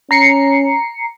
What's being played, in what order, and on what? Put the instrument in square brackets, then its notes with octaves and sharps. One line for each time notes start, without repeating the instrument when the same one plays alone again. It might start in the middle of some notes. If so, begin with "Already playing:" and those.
[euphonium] C#4 [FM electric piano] A#5 C7 C#7